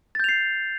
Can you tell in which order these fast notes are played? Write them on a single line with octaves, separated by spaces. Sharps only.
A6 G6 F7 C7